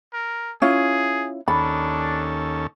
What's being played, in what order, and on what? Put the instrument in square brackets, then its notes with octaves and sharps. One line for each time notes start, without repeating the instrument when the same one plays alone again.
[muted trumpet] A#4
[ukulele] C#4 E4 F4 [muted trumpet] G#4
[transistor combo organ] D#2 C#4 A4 [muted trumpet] D4 [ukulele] B5